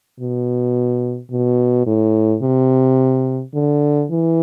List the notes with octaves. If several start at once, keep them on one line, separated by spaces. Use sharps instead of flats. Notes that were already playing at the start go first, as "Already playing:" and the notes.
B2
B2
A2
C3
D3
E3